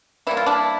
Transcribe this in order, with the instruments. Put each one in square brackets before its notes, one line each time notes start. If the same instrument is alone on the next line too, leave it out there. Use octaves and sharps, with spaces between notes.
[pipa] E3 G3 A#3 E4
F4
D4 E4